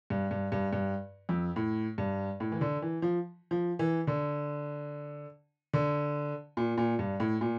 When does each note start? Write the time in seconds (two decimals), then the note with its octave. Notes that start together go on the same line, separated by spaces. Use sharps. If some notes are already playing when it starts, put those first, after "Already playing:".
0.10 G2
0.31 G2
0.52 G2
0.73 G2
1.29 F2
1.56 A2
1.98 G2
2.40 A2
2.52 E3
2.61 D3
2.82 E3
3.02 F3
3.51 F3
3.79 E3
4.07 D3
5.73 D3
6.57 A#2
6.78 A#2
6.99 G2
7.20 A2
7.41 A#2